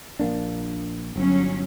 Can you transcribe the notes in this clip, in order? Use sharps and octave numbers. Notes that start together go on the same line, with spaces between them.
A#1 A#3 D4
G1 F#3 C#4